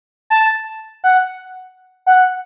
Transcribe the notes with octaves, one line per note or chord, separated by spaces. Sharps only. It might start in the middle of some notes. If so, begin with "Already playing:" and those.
A5
F#5
F#5